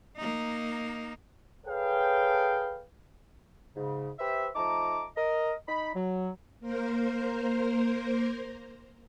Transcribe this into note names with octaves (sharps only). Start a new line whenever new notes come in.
A#3 D#4
G#4 A4 B4 C#5 F5 G5
G#2 C#3
G4 B4 C5 E5
F3 A3 D#4 A5 A#5 D6
A#4 D#5
D#4 B5
F#3
A#3 A#4 C5